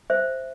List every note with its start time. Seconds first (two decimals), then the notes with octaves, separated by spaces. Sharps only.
0.10 C5 E5